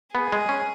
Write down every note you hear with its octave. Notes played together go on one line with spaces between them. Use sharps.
B3 G#4
G#3
C#4